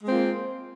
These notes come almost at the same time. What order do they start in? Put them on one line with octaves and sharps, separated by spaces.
G#3 C4 F4 A#3